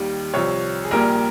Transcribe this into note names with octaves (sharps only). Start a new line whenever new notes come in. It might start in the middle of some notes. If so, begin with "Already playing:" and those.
Already playing: D#2 D#3 G3 G4
C2 C3 F3 C#5
G#4
A#1 A#2 G3 A#4